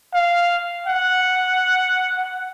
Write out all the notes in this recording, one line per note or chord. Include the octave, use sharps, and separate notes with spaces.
F5
F#5